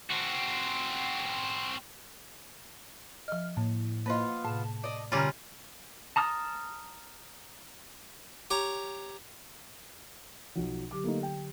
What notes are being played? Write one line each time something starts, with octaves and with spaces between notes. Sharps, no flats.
C4 F#4
F3 D#5 F6
A2 A#3
A#3 B3 F4 C5 D#5
A2 C3 A5
D5 D#5
B2 D3 G3 C#4 F4 A5 A#5
A5 A#5 D#6 F6
G4 C#5 A#5
B1 F3 F#3
D3 F#3 G4 D6
A3 A#3 D#4
G5